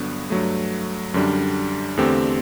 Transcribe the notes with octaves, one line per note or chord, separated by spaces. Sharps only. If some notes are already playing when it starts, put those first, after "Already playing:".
Already playing: G2 D3 F#3 B3
G2 F#3 A3
F#2 D3 G3 D4
E2 D3 A3 C4 G4